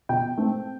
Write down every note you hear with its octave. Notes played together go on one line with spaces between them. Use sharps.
B2 G5
A3 C4